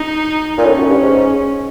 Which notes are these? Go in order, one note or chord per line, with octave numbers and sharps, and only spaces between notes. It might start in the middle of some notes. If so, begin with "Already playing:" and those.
Already playing: D#4
A#2
A2 C#4
F#2
G2
G#2